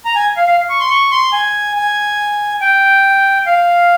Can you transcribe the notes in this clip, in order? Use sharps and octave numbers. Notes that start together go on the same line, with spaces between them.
A#5
G#5
F5
F5
C#6
C6
C#6
C6
G#5
G#5
G5
F5